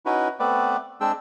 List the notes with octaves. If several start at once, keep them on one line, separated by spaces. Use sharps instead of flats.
C#4 D#4 E4 F#4 B4
A3 B3 C4 B4 D5
G#3 C4 D4 G5 E6